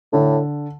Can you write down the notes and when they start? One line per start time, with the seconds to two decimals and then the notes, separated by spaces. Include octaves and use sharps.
0.13 A2 D3